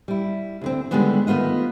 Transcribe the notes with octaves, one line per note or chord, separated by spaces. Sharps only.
G3 E4
D2 D3 C4
D3 D#3 G3 G#3 B3 D4
D#3 A3 B3 F4 D#5